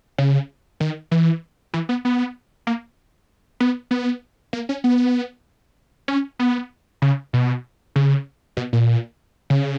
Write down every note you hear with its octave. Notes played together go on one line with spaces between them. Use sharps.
C#3
D#3
E3
E3
B3
B3
A#3
B3
B3
A#3
C#4
B3
C#4
B3
C#3
B2
C#3
B2
A#2
C#3